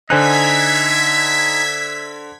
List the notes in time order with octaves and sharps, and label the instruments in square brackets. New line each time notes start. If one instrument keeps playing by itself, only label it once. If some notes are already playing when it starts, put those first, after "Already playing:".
[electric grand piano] D3 C5 F#6 [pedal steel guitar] D#4 G#5 [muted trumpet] E5 [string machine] G#6 B6